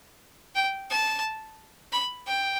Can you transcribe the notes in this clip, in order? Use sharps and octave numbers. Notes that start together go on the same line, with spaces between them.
G5
A5
B5
G5